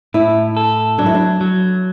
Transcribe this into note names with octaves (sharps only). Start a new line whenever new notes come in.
A2 E4
A4
F#3 D4
E4
D4
F#3